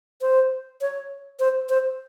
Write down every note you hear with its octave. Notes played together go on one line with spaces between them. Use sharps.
C5
C#5
C5
C5